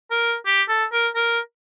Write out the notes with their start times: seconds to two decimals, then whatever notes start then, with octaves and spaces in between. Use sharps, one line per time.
0.11 A#4
0.46 G4
0.69 A4
0.92 A#4
1.15 A#4